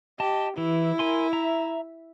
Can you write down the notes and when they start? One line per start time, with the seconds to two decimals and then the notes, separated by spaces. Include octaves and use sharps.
0.20 G4 D#5 A5
0.58 E3 E4
0.99 A#4 G#5 C6
1.33 E5 A#5